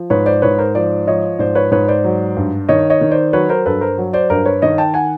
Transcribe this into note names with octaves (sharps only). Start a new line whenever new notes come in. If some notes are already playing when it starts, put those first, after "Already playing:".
Already playing: F3
G#2 B4 C#5
C5 D5
G#2 B4 C#5
A#4 C5
F3 C5 D5
F3 C#5 D#5
G#2 C5 D5
B4 C#5
G#2 B4 C#5
C5 D5
F#3
G2
D#3 C#5 D#5
C#5 D#5
D#3
C5 D5
F#3 B4 C#5
A#4 C5
G2 A4 B4
A#4 C5
F#3
C5 D5
G2 A#4 C5
B4 C#5
D#3 C#5 D#5
G5 A5
F#5 G#5